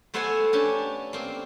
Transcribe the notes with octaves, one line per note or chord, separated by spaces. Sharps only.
A3 B3 C5 E5 F#5 G#5
C#4 D4 G4
A#3 C4